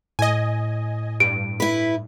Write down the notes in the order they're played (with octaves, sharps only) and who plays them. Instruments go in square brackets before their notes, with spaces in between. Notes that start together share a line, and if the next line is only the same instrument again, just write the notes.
[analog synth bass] A2 [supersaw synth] D#5 G#5
[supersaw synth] G2 [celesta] D7
[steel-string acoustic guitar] E4 B4